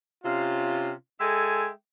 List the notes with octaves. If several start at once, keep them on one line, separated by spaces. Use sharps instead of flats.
C3 C#4 F4
G#3 A4 E5 G5 G#5